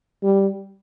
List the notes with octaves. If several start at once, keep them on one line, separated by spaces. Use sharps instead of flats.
G3